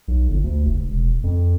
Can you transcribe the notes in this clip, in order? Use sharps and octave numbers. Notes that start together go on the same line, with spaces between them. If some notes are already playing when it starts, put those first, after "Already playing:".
B1
G1
D2
F1
E1
F2